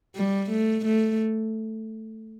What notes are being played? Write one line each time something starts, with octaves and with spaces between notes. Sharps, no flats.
G3
A3
A3